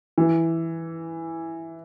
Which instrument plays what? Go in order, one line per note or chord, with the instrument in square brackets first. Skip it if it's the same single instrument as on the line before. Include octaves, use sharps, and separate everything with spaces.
[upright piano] E3